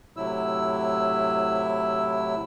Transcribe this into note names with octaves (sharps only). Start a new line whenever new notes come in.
A2 C3 F#3 E4 E6